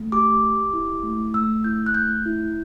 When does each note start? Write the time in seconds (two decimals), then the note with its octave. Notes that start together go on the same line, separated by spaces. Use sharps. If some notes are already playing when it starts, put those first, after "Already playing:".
Already playing: A3
0.12 G4 D6
0.43 G4
0.73 E4
1.03 A3
1.34 A3 E6
1.64 E4 G6
1.86 F#6
1.95 A3 G6
2.26 E4